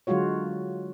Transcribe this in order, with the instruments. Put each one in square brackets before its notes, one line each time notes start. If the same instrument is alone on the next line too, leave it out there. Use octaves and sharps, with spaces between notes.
[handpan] D3 F#3 G#3 F4 F#4 C#5